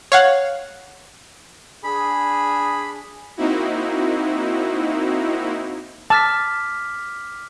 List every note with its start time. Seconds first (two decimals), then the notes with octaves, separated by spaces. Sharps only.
0.12 C#5 F5 F#5
1.84 D4 G#4 B5
3.37 A#3 C4 D#4 E4 F#4
6.10 A5 D6 F6 B6